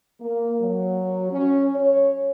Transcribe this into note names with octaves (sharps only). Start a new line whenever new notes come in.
A#3
F#3
C#4
C#5